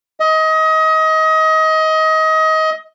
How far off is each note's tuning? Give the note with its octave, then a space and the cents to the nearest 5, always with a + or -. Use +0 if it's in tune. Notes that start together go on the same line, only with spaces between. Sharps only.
D#5 +25